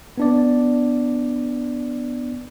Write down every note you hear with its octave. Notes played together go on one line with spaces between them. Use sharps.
B3 D4 D5